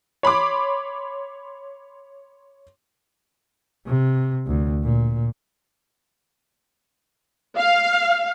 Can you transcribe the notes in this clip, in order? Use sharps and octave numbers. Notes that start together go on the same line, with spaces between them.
C#5 B5 C6 D6
C3
D2
A#2
F5